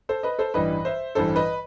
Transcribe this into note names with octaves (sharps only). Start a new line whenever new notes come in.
A4 C5
B4 D#5
A4 C5
A1 G2 E3 G3 B4 D#5
C5 E5
A1 G2 E3 G3 A4 C5
B4 D#5